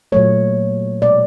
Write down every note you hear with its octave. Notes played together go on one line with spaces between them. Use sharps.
A#2 F#3 A3 C#5
B2 G#3 D5